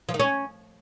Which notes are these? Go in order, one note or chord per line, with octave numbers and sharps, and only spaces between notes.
F3
D#3
C#4